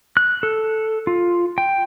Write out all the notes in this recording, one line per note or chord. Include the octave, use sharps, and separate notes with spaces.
F#6
A4
F4
G5